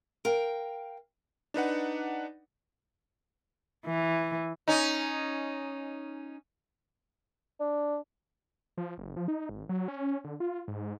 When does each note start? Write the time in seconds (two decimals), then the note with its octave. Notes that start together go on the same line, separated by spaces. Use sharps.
0.25 A#4 F5 G5
1.54 D4 D#4 B4 F#5
3.86 E3
4.68 C#4 D#4
7.60 D4
8.78 F3
8.98 F#1
9.17 F3
9.28 D#4
9.49 G#1
9.69 F#3
9.88 C#4
10.24 D3
10.40 F4
10.68 G#2